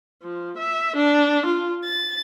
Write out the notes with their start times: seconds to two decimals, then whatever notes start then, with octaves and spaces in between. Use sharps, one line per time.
0.22 F3
0.57 E5
0.96 D4
1.45 F4
1.85 A6